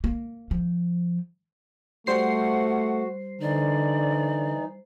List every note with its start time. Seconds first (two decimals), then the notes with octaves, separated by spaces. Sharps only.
0.04 A#3
0.51 F3
2.07 G3 A3 F#4 C5 F#5 C7
3.41 D3 E3 D#4 D5